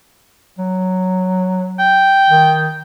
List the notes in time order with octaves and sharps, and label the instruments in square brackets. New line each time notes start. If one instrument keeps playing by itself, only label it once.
[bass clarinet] F#3
[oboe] G5
[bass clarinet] D#3